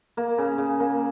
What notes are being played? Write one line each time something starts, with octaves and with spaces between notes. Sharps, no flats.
A#3
C#3
C#3
A#3